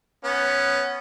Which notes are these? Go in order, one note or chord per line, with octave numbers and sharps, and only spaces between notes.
B3 C#4